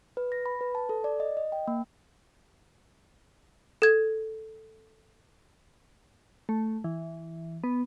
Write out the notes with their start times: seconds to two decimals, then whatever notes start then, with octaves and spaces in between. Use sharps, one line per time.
0.17 B4
0.32 A#6
0.46 B5
0.61 B4
0.75 A5
0.89 A4
1.04 D5
1.20 D#5
1.37 D#5
1.52 G5
1.68 A#3
3.82 A4 G#6
6.49 A3
6.84 E3
7.64 B3